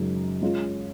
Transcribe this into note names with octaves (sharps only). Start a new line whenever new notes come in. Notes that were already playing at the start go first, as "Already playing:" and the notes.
Already playing: F#2 C#3 G#3 D#4
G#3 C#4 F4